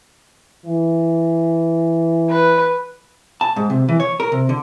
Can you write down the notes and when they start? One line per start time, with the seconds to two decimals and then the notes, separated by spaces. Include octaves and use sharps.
0.65 E3
2.30 B4
3.41 A5
3.56 G#2
3.70 C3
3.89 E3
4.00 C#5
4.20 A#4
4.32 C3
4.49 D3